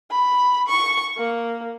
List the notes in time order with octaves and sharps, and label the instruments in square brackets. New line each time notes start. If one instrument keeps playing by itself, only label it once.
[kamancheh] B5
C#6
A#3